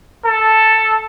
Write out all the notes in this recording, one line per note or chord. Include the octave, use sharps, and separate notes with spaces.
A4 A5